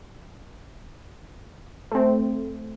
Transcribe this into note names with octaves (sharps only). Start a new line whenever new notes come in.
A3 C4